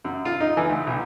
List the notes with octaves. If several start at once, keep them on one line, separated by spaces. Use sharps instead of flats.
F#2
F4
D#4
E3
D2
B1